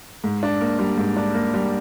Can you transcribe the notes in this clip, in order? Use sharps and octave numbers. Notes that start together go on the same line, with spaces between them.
G#2
D4
A#3
G3
G#2
D4
A#3
G3